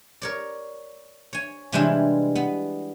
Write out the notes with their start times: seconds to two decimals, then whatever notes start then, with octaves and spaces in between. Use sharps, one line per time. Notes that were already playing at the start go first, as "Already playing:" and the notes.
0.22 A#4 C#5 D5
1.33 C#5 G#5
1.72 C3 E3 G3 G#3 D4 E4
2.35 B3